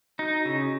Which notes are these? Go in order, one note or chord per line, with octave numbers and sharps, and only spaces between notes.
D#4 F#4
C#3 E4